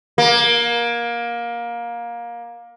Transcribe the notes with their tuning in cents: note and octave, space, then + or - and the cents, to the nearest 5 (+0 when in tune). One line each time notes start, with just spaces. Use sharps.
A#3 +20